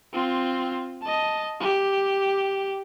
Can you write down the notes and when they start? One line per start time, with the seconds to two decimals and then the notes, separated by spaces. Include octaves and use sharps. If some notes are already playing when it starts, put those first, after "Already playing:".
0.13 C4 F4
1.02 D#5 A5
1.60 G4